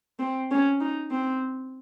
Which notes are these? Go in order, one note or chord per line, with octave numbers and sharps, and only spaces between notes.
C4
C#4
D#4
C4